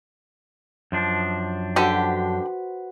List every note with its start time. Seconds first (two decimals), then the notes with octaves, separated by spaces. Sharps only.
0.92 F#2 F3 D4
1.76 D3 F#4 G4 B4 C5